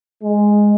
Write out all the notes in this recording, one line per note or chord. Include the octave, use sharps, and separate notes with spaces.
G#3